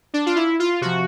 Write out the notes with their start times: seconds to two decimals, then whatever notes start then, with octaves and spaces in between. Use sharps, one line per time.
0.14 D4
0.26 F4
0.36 E4
0.60 F4
0.81 C3 F3 F#4